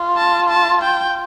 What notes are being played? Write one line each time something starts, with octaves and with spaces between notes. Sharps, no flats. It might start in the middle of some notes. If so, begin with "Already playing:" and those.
Already playing: F4
A5
A5
G5